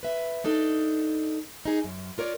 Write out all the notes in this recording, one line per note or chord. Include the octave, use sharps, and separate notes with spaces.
B4 E5
D4 D#4 A4
D#4 G#4
F#2
F4 A#4 C#5 D5